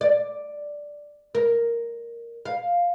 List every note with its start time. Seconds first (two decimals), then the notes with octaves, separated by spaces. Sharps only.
0.01 D5
1.35 A#4
2.45 F5